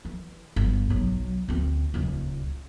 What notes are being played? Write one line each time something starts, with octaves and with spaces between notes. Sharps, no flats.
E3
G1
B1 F#3
D2 C4
D#1 C#2